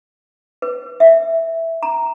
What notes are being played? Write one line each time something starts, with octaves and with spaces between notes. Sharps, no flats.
B4
E5
A#5